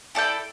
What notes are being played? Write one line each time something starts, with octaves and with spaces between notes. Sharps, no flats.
E4 A4 D5 G5